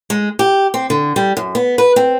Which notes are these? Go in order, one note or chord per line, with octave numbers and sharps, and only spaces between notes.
G#3
G4
C4
D3
G3
F#2
B3
B4
C4